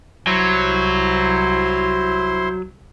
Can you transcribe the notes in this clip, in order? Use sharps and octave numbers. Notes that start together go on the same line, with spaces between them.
C2 F#3 E4 C5 C6